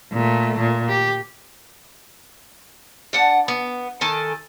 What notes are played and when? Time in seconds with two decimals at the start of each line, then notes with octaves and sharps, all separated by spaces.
0.12 A#2 A3
0.59 A#2
0.88 G4
3.13 D4 F#5 A5
3.48 B3
4.01 D#3 A4 G#5 A5